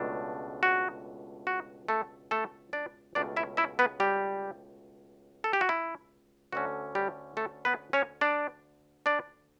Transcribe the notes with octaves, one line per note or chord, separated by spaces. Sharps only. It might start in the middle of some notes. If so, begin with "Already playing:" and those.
Already playing: C#2 B2 A3 D4
F#4
F#4
A3 A4
A3 A4
D4 D5
C#2 B2 A3 C#4 D4 D5
E4 E5
E4 E5
B3 B4
G3 G4
A4
G4
F#4
E4
D2 D3 A3 C#4 F#4
G3 G4
A3 A4
B3 B4
C#4 C#5
D4 D5
D4 D5